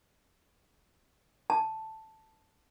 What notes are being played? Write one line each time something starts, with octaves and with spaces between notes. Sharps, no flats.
A5